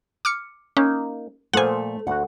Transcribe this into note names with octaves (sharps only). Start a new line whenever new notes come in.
D6 F6 C#7
A#3 C#4 D#4
A#2 F3 A3 C5 F#5 G#5
D2 F#4 F#5